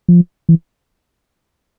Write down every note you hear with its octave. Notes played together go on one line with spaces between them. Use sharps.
F3
E3